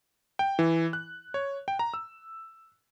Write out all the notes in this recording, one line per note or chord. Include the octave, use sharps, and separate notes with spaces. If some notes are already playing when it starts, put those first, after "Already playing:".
G5
E3
F#6
C#5
G5
A#5
E6